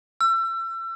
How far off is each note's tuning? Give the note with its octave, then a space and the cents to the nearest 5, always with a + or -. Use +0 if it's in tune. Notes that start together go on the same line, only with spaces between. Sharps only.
E6 +35